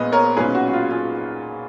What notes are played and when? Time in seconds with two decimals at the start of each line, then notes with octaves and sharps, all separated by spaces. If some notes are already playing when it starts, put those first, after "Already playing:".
Already playing: A#1 A#2 G#3 B3 B4 D#5
0.12 A#4 C#5
0.37 B1 A#2 G#3 C#4 G#4 B4
0.55 F#4
0.68 F#4
0.73 F4
0.91 F4 G#4